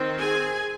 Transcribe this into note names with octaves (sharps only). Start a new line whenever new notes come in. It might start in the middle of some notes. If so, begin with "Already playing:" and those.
Already playing: D#3 C4
G#4 G#5